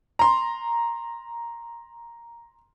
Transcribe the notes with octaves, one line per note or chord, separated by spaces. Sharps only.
A#5 C6